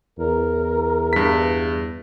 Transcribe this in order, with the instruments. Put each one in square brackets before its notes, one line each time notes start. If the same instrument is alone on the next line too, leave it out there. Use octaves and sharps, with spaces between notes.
[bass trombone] E2 [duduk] A#4
[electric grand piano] G2 B6